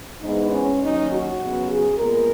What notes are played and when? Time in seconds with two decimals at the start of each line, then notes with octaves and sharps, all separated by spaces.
0.22 G#2 E3 G#3 B3 D#4
0.51 C#4
0.81 D#2 D#3 F#3 C#4 D#4
1.11 F#4
1.40 C#3 F#3 B3
1.69 G#4
1.98 A#2 G#3 B3 A#4